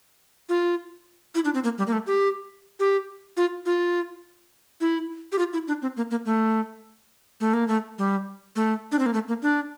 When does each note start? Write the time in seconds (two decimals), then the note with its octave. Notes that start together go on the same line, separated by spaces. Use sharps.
0.49 F4
1.35 E4
1.45 D4
1.54 C4
1.64 A#3
1.78 G3
1.87 A#3
1.93 A3
2.07 G4
2.80 G4
3.37 F4
3.66 F4
4.81 E4
5.32 G4
5.39 F4
5.53 E4
5.68 D4
5.82 C4
5.97 A#3
6.11 A#3
6.26 A3
7.40 A3
7.54 A#3
7.68 A3
7.98 G3
8.56 A3
8.92 D4
8.99 C4
9.06 A#3
9.14 A3
9.28 A#3
9.42 D4